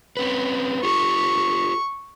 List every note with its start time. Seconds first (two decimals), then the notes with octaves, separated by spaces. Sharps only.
0.17 C4 C#4 B4
0.83 F4 G4 A4 C#6